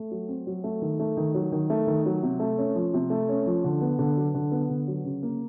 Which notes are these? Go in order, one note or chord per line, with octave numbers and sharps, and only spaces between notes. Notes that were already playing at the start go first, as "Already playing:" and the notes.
Already playing: A3
F#3
C4
F#3
A3
D#3
A3
D#3
F#3
D#3
A3
D#3
F#3
C3
A3
C#4
F3
C3
A3
C#4
F3
D3
B3
D3
F#3
D3
B3
D3
F#3
C#3
A#3